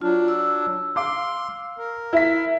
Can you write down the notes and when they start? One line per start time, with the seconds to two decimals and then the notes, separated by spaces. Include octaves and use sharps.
0.01 F#3 D4 F4
0.28 E6
0.96 F5 C6 D6
1.78 A#4
2.13 E4 B6